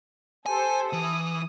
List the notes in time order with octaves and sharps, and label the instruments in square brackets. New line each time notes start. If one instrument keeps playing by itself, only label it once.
[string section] G4 A4 C5 [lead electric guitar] G#5
[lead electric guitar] E3 [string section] D#6